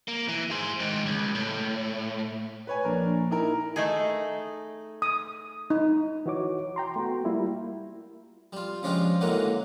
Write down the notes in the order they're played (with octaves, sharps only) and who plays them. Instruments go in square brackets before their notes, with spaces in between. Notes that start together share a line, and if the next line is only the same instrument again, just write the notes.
[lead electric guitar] A#3
E3
G#4 C5
G#2 D#3
C#2
A2
[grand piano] B4 C#5 G#5
[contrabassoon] A#1 [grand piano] D4 A#4
[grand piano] D#4 E4 A#4
[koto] A3 D#4 G#4
[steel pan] D#6
D#4
[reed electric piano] E3 F#4 C#5 D6
G5 A#5 C6
A3 B3 F#4
G3 A#3 E4 F4
[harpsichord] G3 F4
C#3 F3 G#3 D4 F4 G4
G#2 D3 E3 F#3 G#3 A#3